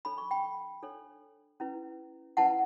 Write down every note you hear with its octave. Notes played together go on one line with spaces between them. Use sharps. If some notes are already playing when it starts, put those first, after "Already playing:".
D4 A4 C#5 B5
C#6
G5 B5
D4 A4 C#5
C#4 E4 B4
C#4 E4 B4 F#5 A5